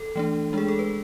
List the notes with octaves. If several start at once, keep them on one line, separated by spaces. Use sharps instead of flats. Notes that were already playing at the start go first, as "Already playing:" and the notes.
Already playing: A4
E3 A3 D4
G#3 D4 G#4
A4
B4